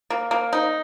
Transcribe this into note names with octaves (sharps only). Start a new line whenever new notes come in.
A#3
A#3
D#4